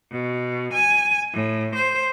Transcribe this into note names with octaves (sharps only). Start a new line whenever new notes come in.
B2
G#5
A2
C5